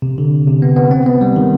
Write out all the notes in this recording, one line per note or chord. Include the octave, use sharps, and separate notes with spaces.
C3
D3
C3
B3
B3
C4
B3
G3
D#3